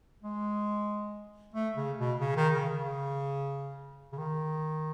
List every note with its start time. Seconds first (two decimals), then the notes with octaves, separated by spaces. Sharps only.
0.23 G#3
1.54 A3
1.77 C#3
1.98 B2
2.20 C#3
2.36 D#3
2.53 C#3
2.70 C#3
4.12 C#3
4.18 D#3